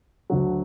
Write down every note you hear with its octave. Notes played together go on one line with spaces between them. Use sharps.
D2 D3 F#3